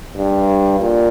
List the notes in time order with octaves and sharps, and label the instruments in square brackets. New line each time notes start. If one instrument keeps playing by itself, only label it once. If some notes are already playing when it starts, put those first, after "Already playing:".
[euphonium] G2
A#2